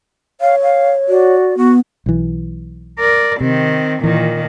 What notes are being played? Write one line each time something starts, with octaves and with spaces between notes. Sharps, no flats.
C#5 F5
F5
F#4 D5
B3 F#4
B1 E3
A#4 D5
C3 D#3 C4
A#2 D#3 E3